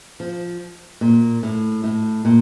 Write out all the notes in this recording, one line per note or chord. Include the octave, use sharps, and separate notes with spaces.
F3
A#2
A2
A2
A#2